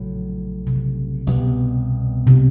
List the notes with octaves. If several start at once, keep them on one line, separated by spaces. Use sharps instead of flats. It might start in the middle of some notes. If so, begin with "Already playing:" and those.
Already playing: A#1 A2 C#3 F#3
C3
C#3
C2 B2 G3 B3
C3